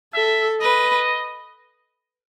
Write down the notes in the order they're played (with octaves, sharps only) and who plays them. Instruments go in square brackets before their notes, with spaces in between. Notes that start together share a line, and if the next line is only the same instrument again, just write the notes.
[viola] A4 [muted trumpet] E5
[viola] B4 [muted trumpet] D#5